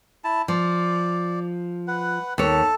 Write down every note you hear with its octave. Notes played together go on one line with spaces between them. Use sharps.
E4 A5
F3 D5
B4 F#5
D#2 A4 C#5 A5